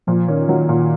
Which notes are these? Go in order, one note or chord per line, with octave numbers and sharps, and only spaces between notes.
A#2 F3
D#3 C#4
D#3 F#3
A#2